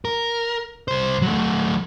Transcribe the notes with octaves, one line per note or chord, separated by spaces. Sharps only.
A#4
C2 C5
F#3 A3